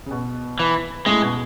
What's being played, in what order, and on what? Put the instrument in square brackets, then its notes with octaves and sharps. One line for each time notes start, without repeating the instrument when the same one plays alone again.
[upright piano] C#3
B2
[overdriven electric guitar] E3
[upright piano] A2 [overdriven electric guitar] G#3
[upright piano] B2